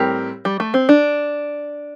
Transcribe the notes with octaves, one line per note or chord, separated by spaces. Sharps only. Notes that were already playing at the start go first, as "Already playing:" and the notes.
Already playing: A2 G3 C4 G4 A#4
G3
A3
C4
D4